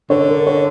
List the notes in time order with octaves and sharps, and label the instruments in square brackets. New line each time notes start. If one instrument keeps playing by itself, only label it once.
[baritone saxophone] D3 [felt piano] C#5
[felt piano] A#4
C#5